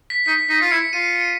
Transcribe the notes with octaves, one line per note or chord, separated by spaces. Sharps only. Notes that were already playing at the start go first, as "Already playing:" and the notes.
B6
D#4 B6
D#4 B6
F4
E4 C#7
F4 D#7
C#7